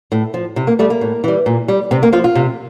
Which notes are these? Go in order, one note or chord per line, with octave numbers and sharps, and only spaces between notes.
A2
F3
C3 E4
A#3
G3 A3
A#3
A2
E3 G3
A#2
G3
C3 C4
A#3
F3 F4
F4
C3